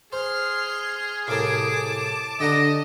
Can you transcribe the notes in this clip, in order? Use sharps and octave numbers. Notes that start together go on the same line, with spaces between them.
G#4 C5 C6 F6
C2 A2 A#4 A5 D6
D3 G4 D#5 F#5 A#5